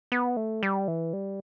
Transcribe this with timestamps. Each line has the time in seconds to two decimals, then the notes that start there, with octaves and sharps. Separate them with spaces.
0.12 B3
0.37 A3
0.63 G3
0.88 E3
1.13 G3